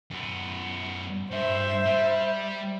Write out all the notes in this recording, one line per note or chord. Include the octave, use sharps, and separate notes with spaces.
F#2 B3
G2 C5 E5
G3